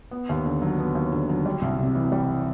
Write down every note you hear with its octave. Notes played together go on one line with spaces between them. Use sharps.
B3
D#2
D3
F#3
B3
D#2
D3
F#3
G3
C2
C3
E3
G3